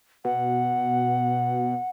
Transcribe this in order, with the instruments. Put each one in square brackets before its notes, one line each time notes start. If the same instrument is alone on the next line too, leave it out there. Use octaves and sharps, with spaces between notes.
[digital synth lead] B2 [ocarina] F#5